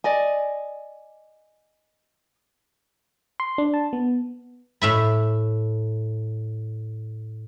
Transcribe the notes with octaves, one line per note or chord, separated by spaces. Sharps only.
D5 D#5 G#5
C6
D4
A5
B3
A2 E5 B5